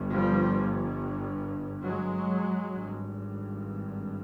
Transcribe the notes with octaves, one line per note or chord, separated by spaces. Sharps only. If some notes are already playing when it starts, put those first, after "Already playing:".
Already playing: G1 G2
F3 G3
F#3 G#3
G#1 G2